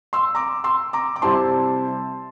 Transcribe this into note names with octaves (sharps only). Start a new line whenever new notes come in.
C6 E6
A#5 D6
C6 E6
A#5 D6
D6
C3 G3 C4 E4 A5 C6